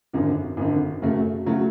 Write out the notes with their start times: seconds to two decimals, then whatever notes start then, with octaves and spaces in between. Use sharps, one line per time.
0.13 G#1 F#2 D3
0.57 G#1 F#2 D3
1.02 F#2 C#3 F#3 A3
1.46 C#3 F#3 A3